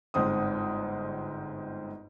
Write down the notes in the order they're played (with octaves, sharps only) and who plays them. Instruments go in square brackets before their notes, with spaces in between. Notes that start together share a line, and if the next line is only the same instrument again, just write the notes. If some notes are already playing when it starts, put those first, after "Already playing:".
[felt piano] G1 G#2 C4 D#6